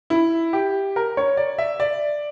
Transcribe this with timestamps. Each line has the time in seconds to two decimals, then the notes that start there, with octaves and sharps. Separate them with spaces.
0.10 E4
0.53 G4
0.96 A#4
1.17 C#5
1.37 D5
1.58 E5
1.80 D5